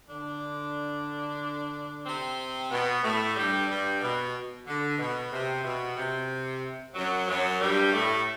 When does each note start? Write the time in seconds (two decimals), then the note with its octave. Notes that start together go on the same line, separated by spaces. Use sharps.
0.09 D3 D4
2.05 C3 C4
2.71 B2 B3
3.02 A2 A3
3.36 G2 G3
3.68 G2 G3
4.01 B2
4.66 D3
4.98 B2
5.31 C3
5.64 B2
5.97 C3
6.94 F#2 F#3
7.28 F#2 F#3
7.60 G2 G3
7.92 A2 A3